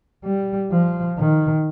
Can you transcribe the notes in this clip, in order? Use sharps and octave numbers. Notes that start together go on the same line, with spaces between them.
G3
F3
D#3